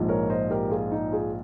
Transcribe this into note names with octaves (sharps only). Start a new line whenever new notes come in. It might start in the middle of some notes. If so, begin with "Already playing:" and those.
Already playing: A#1 G#2 F3
A#4 C#5
C5 D#5
G4 A#4
F4 G#4
D#4
F4 G#4